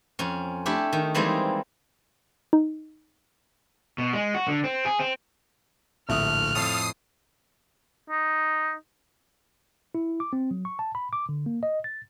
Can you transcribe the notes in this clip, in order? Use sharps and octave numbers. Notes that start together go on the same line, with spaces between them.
F2 C#4
A3 D4 E4 G4
D#3
E3 G3 G#3 A#3 C4 D#4
D#4
B2
G#3
F#4
D3
C4
G#4
C4
D1 A#1 A3 E4 D#6 F6 F#6
F2 A2 A4 F5 D#6 C7
D#4
E4
D6
C4
F#3
C#6
A5
B5
D6
D3
A#3
D#5
A6